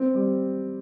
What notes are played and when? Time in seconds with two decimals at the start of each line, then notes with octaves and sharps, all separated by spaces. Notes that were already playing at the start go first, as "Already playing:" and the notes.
Already playing: C4
0.14 G3